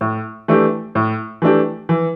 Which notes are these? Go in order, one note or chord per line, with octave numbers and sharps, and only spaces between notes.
A2
E3 A3 D4 G4
A2
E3 A3 D4 G4
E3